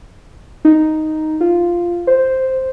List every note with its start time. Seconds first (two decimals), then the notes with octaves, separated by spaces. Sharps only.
0.65 D#4
1.41 F4
2.07 C5